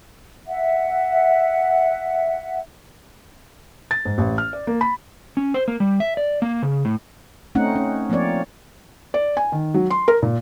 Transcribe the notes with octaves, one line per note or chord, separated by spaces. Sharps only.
E5 F#5
A6
G#2
A1
F6
D5
A#3
B5
C#4
C5
A#3
G3
E5
D5
A#3
C#3
A2
A3 C4 C#4 D#4 F#5
C#4
F3 A#3 C4 C#5 D5
D5
G#5
D#3
F#3
C6
A#4
A#2